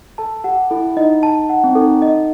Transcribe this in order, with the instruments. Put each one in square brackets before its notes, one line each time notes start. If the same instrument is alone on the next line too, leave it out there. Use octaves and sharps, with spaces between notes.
[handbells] A4 [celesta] A5
[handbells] G4 [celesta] F#5
[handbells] E4 [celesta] A4
[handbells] D#4 [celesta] D#5
[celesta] A5
F#5
[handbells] C4
[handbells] D#4 [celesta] A4
[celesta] D#5